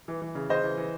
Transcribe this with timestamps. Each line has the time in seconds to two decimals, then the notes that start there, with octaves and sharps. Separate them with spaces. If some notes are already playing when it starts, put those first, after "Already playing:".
0.08 E3
0.22 E3
0.35 C#3
0.49 C#3 C5 D#5
0.63 E3
0.77 E3